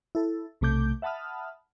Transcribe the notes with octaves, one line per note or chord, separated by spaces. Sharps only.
E4 A4
B1 C3 A3 D6 G6
E5 F#5 A5 B5 D#6 F6